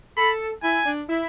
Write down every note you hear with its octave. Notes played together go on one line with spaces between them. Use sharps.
A4 B5
E4 G#5
D4
E4